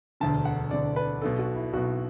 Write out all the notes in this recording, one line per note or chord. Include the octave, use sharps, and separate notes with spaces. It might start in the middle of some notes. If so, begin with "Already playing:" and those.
E1 D2 D3 A5
F#5
E1 D2 D3 D5
B4
B1 B2 A4
F#4
E4
B1 B2 F#4